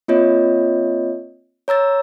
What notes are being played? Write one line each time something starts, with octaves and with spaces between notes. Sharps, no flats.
A#3 C4 F4 C#5 D#5
C#5 A#5 E6 A6